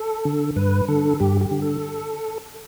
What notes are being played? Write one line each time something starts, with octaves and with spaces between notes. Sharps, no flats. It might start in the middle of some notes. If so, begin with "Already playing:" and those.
Already playing: A4
D3
G2 B4
D3 A4
G2 G4
G4
D3
A4